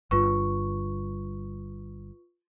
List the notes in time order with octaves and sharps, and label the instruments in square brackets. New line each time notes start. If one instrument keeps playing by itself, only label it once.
[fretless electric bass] G1 G2 [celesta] F4 B4 C#6